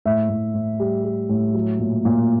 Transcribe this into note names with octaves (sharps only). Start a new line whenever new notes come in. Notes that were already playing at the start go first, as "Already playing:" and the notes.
A2 E5
A2
A2
G3
G3
A2
F#3
A#2
A#2